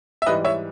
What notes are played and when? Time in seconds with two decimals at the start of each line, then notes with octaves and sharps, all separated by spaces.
0.22 E5
0.26 G#2 E3 G3 B4 D#5
0.45 C#5 E5